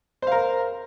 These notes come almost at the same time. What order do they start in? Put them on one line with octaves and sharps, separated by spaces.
C5 F5 A#4